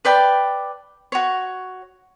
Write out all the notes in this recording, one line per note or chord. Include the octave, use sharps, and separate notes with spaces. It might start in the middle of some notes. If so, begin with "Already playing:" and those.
B4 D5 G5 A5
F#4 C#5